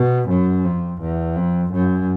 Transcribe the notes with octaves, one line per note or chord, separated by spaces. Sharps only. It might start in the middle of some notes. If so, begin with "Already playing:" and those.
Already playing: B2
F#2
F2
E2
F2
F#2